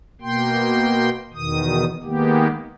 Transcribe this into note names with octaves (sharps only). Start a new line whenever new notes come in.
B2 A#3 G5 C6
E2 B2 D#3 D#6
D#3 G#3 A#3 B3 G4